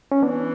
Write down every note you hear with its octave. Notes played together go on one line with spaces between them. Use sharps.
C#4
E3 B3 D4